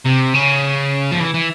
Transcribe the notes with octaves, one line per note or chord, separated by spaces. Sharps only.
C3
C#3
F3
E3
E3